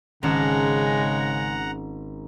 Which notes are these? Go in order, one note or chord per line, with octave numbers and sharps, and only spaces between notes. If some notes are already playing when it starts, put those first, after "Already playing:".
G#1 C#3 G#3 C#4 F#5 A5 A#5